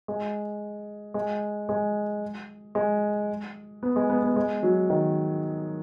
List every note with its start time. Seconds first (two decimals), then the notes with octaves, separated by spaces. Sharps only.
0.08 G#3
1.14 G#3
1.69 G#3
2.75 G#3
3.83 B3
3.96 G#3
4.10 B3
4.23 B3
4.36 G#3
4.63 F#3
4.90 D#3